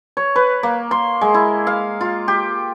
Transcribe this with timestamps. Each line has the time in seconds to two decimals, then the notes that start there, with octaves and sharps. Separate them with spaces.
0.17 C#5
0.36 B4
0.63 A#3
0.91 C6
1.21 G#3
1.34 E4
1.67 F5
2.01 F4
2.28 G4